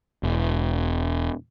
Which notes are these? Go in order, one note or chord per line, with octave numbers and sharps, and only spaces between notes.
E1